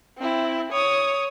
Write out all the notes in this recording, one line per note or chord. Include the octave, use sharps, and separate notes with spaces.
C4 E4
C#5 D#6